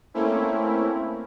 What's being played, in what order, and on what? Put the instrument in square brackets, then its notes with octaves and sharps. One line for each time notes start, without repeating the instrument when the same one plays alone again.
[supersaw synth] A3 A#3 C4 C#4 E4